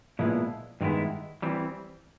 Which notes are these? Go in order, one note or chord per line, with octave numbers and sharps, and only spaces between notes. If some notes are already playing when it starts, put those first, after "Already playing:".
A#2 F3 G#3 B3 E4
G2 D#3 G#3 B3 E4
E3 G3 C4